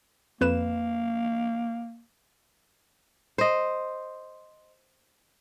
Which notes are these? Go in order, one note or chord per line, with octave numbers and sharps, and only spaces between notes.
F2 A#3 B4 E7
C5 D#5